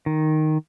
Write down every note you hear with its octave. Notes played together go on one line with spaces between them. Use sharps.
D#3